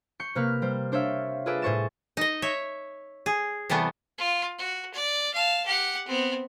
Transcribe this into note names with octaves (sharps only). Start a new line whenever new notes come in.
C#6 G6 C7 C#7
C3 A#3 B4 F6
G3 C5
D4 C5 C#5 E5 F5
F4 G#4 A4 B4 D5 E5
A2 G#4 C5 C#6 A6 E7
D#4 D#5
C#5 E5
G#4
C3 E3 G3 A3 B3
F4
F#4
D5
F5 A5
G4 F#5
B3 C4